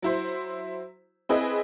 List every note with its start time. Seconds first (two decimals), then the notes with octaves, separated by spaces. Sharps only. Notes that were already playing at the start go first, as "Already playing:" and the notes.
0.02 F#3 E4 C5
1.29 C4 E4 G#4 B4 D#5